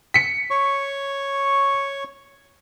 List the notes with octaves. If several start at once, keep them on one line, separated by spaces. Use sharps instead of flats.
B6 C#7
C#5 C#6